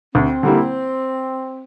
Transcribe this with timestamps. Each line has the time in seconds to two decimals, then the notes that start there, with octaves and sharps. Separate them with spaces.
0.15 D2 C4
0.43 D3 G3 A#3 E4